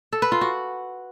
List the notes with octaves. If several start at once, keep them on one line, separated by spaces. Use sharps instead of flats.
A4
B4
F4
F#4